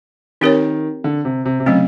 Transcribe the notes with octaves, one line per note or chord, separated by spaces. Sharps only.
D#3 C4 D#4 G4 A#4 C#5
D3
C3
C3
C3
C#3 F#3 A3 C4